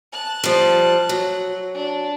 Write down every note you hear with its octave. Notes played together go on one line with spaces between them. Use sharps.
A5 F#6
F3 G3
F#3
D4